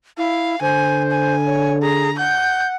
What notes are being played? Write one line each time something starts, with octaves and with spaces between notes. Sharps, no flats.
E4 F5
D3 C5 G#5
G#5
C#5
G#4 A#5
F#5 G6